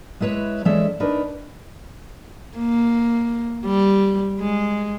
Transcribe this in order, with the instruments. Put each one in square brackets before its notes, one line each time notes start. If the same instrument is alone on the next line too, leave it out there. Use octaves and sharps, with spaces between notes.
[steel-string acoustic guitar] G#3 E4 B4 C#5 E5
E3 G#3 C#4 A4 D5 E5
D4 D#4 A#4 B4
[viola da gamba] A#3
G3
G#3